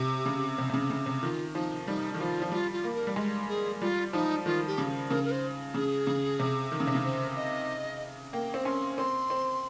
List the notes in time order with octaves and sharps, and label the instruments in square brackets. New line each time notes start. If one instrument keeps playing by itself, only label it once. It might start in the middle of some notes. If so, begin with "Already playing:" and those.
Already playing: [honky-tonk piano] C3 [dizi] G4
[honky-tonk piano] C#3
C3
C3
C#3
C#3
C3
[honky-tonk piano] D#3 [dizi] F4
[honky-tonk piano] F3 [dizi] D#4
[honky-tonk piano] G3 [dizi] D#4
[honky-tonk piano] D#3
[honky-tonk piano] F3 [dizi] F4
[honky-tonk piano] F3
[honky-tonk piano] G3 [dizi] F4
[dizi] F4
[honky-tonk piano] A#3
[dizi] A#4
[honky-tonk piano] G3
G#3
[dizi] G#4
[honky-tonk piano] G3 [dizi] F4
[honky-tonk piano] F3 [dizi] D#4
[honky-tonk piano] D#3 [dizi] F4
[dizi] G4
[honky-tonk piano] C#3
[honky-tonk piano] C#3 [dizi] A#4
[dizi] A#4
C5
[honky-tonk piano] C#3 [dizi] G#4
[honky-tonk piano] C#3
C3
D#3
C#3
C3
C#3
[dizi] C5
D#5
[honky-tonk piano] A#3 [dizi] G5
[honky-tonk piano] C4
[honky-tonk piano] C#4 [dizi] C6
[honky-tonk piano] C4 [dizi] C6
[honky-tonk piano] C4